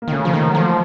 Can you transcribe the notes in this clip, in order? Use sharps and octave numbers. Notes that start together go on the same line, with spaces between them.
A#3
D#3
C#3 A3
F3
A3
D#3 A#3
F#3
F3 A3